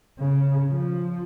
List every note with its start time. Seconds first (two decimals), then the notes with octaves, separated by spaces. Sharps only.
0.19 C#3
0.70 F3